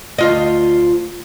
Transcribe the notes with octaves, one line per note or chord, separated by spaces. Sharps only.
D2 F4 D#5